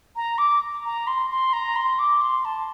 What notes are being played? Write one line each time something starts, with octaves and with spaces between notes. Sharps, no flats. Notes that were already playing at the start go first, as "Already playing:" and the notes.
A#5
D6
A#5
C6
C6
A#5
C6
D6
C6
A5